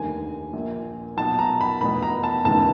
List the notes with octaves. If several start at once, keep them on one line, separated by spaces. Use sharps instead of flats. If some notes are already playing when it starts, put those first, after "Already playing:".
Already playing: F1 D#2 D3 G#5
A#1 A#2
B1 B2 A5
A#5
B5
F1 E2 B2 B5
A#5
A5
F1 D#2 C#3 E3 A5